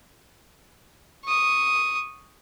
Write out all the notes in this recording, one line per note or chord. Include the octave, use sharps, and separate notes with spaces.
C#6 D#6